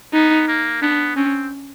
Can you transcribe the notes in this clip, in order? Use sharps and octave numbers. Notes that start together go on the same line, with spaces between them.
B3 D#4
A#3
B3 D4
C4 C#4